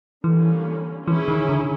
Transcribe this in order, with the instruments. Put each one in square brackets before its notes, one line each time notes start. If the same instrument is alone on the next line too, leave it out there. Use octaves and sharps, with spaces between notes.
[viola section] D3 G3 A#3 C#4 [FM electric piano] E3
[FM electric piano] E3 [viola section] C#4 E4 G#4
[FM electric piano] D#3
D3